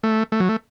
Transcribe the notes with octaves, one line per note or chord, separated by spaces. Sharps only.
A3
A3
F#3
A3